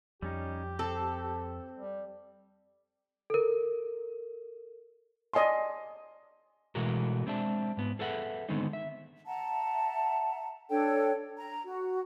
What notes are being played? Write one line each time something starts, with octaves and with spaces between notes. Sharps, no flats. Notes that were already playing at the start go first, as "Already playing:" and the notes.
F2 G3 C#4 D#4 G4
C4 A4
G3
A4 A#4
D5 D#5 G#5 A5 C6
B2 E3 G#3 A3 F#4 A#4
G#3 C4 D4 E5 A5
G#2 B3
G#4 A4 B4 E5 F#5
D3 D#3 G#3 B3 C4 D#4
E5
E5 F#5 A5 A#5
D4 A4 C#5 G5
A#5
F#4